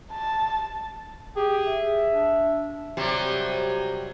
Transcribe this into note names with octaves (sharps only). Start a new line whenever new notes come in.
A5
G4 G#4
E5
D4
C3 F#3 G3